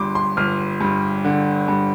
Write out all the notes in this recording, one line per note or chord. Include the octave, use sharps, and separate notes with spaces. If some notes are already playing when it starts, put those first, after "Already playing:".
Already playing: G1 G2 C6 D6
C6
G1 F6
G2
D3
G2